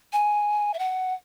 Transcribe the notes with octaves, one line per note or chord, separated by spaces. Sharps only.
G#5
E5
F#5